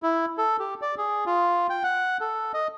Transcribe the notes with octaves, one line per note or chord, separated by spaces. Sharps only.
E4
A4
G4
D5
G#4
F4
G5
F#5
A4
D#5